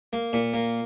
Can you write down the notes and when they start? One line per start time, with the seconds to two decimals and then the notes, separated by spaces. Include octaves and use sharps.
0.13 A#3
0.33 A#2
0.54 A#3